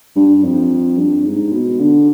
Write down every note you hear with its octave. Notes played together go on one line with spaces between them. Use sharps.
G2
F2
G2
G#2
B2
D3